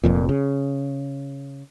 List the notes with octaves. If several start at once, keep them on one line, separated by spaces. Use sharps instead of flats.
F1 F2 A#2
C#3